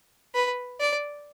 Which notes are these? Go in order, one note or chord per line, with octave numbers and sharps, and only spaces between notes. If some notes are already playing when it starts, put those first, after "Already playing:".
B4
D5